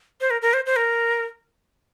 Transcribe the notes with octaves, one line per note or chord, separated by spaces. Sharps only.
C5
A#4
A#4
C5
C5
A#4